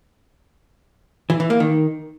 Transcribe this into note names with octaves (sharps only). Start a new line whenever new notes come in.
E3
E3
A#3
D#3